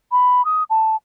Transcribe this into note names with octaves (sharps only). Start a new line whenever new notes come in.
B5
D#6
A5